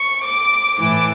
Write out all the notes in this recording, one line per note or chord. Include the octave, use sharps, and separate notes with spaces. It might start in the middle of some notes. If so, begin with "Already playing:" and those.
Already playing: C#6
D6
A2 E3 D6